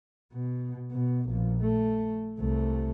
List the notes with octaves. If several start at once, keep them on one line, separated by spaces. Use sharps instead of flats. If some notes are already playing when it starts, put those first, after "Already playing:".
B2
B2
A#1
A3
C2 A3